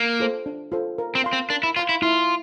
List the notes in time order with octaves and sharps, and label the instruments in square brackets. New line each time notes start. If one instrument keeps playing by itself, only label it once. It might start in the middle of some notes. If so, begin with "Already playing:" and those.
Already playing: [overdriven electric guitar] A#3
[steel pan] F4 A4 C5
D4
F4 A4 C5
A#4
[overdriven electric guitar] C4
[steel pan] F5 C6
[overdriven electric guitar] C4
[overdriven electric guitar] D4 [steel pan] A#4
[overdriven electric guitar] E4
[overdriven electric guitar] F4 [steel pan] F5 C6
[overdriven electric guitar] E4
[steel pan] E4 [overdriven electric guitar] F4